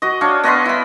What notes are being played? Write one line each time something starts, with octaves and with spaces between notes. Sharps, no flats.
F#4 D#5
D4 C#5 F5
B3 D#5 B5 C6
E4 B5